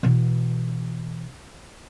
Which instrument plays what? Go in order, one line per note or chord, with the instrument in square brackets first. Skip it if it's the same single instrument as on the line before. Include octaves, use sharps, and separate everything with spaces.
[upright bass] B2 E3